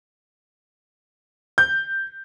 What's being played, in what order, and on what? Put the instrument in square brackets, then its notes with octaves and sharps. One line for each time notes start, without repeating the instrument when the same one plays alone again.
[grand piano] G6